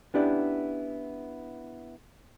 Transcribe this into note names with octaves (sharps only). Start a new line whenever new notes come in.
B3 C#4 D4 E4 G4 D5